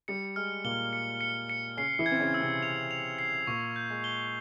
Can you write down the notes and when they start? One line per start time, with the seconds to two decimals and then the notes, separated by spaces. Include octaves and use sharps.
0.08 G3 C#7
0.36 G#3 F6
0.64 A#2 A#3 G7
0.93 C#7
1.21 C#7
1.50 C#7
1.77 C#3 C#4 C7
1.99 E3 E4
2.06 G#6
2.11 C4
2.19 C#3 C#4
2.34 E6
2.41 C3 C4
2.62 F7
2.91 F7
3.19 C7
3.47 A#2 A#3 C#6
3.76 G6
3.90 G#3
4.04 G7